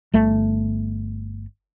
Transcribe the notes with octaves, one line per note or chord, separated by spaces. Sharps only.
G1 A3